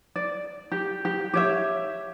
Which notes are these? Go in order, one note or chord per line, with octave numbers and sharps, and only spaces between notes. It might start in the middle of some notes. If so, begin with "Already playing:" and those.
D5
G4
G4
G4 C#5 E5